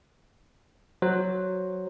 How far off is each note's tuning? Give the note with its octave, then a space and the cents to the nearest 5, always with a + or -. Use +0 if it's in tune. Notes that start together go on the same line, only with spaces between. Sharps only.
F#3 +5 C5 +10